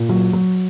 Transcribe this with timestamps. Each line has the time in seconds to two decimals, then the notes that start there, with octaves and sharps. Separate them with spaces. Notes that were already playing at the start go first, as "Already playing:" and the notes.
Already playing: A#2
0.09 F#3
0.33 F#3